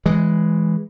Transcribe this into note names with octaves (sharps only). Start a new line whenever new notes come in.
E3 G#3